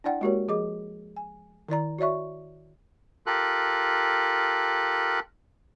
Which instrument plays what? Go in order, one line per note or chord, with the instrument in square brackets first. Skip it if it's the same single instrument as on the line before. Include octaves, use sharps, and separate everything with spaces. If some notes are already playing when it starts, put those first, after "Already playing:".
[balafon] D4 E4 D5 F#5 G5
G#3 A#3 F#4 G4 A#4 C#5
F3 G#4 D#5 D6
G#5
D#3 E4 D5 A#5
F#4 C#5 D5 E5 C#6
[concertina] F4 G4 A4 A#4 F#6